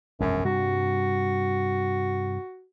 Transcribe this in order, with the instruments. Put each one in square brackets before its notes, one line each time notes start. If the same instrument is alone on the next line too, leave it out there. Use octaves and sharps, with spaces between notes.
[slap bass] E1 A#1 G#3 [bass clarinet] F#2
[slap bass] G2 C3 G3 [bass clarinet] F#4